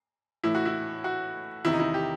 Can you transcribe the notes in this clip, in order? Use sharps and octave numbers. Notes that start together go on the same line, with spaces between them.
A2 E3 E4
F#4
E4
F#4
E2 C3 D#3 E4
D#4
E4
G4